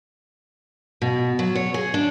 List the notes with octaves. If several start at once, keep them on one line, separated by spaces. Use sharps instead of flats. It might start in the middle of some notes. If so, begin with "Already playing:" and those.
B2
F#3
C#5
G#4
D4